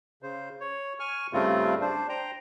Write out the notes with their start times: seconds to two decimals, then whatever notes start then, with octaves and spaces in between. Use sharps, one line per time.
0.23 C#3 C5
0.61 C#5
1.00 G#5 C#6 F6
1.33 G2 C#3 G3 A3 C4 F4
1.81 D4 C5
2.09 C5 G5 A#5